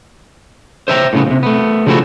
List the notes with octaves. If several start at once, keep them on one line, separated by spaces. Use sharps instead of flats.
C5 C#5 E5 G5 A5 A#5
A2 C#3 B3
D#2 C3
A3 B3
C#3 F3 G3 A3 E4 F#4